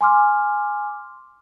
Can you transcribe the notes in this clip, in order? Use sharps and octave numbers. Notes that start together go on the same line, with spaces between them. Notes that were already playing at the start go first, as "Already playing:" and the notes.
G#5 C6 D6 F6